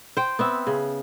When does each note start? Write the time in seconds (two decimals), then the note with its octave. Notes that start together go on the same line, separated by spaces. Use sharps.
0.17 C5 G5
0.39 B3 C4 E5
0.67 C#3